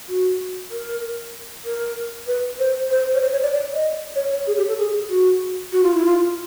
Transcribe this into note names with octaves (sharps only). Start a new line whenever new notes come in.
F#4
A#4
A#4
B4
C5
C5
C#5
C5
C#5
D5
D5
D#5
C#5
C#5
G#4
G4
A4
G#4
F#4
F#4
F4
E4
F4